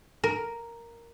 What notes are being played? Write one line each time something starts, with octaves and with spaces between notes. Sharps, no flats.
A#4